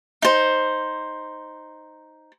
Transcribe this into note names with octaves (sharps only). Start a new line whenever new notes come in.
D#4 C5